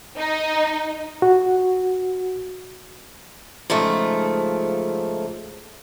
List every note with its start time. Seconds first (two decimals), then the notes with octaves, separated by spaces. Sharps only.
0.18 D#4
1.22 F#4
3.70 G#2 C#3 F3 A3